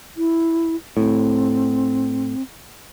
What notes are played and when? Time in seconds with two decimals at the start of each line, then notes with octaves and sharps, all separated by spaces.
0.17 E4
0.97 A2 C4